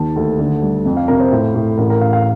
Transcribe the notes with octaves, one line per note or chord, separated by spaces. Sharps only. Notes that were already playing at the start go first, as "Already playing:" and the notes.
Already playing: D#2 D#3 A5
D2
D3
G3
F2
F5
C3 A#4
C5
A2
A2
A1 A#4
A#4
A1 F5
F5